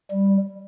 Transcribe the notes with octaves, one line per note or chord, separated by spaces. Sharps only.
G3